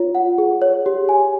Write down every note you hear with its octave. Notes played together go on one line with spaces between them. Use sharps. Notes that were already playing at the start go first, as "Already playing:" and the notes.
Already playing: F4 C#5
F#5
G#4
C#5
G4
G#5